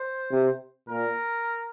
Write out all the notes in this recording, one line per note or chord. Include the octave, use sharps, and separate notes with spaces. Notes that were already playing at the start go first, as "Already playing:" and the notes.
Already playing: C5
C3
A#2 A#4